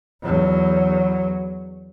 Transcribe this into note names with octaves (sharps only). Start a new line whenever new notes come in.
E2 F#3